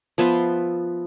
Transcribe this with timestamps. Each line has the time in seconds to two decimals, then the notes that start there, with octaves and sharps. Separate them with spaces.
0.18 F3 B3 E5 C6